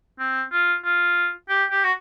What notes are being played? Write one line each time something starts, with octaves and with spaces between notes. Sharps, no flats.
C4
F4
F4
G4
G4
F#4